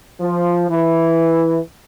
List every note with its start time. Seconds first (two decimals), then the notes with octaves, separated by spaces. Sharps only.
0.20 F3
0.69 E3